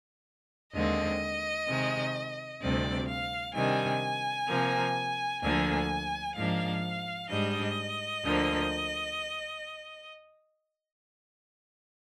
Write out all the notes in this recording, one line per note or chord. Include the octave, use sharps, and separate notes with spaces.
D#2 D3 G#3 C4 D#5
C3 D#3 G#3
D2 C3 G3 C4 D5
F5
C3 D#3 G3 D4 G#5
C3 F3 A#3
D2 D3 F3 A#3 D4 G#5
G#2 F3 A#3 D4 F5
G#2 G3 D4 D#5
D2 D3 F3 A#3